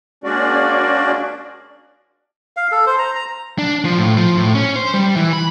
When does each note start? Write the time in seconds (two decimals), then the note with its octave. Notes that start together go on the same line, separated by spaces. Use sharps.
0.24 G#3 A#3 C#4 D4 F#4 D5
2.57 F5
2.71 A4
2.86 C5
2.98 A#5
3.15 A#5
3.59 D4
3.85 F3
3.98 A2
4.17 F3
4.37 A2
4.55 C#4
4.76 C5
4.94 G3
5.16 E3
5.33 B5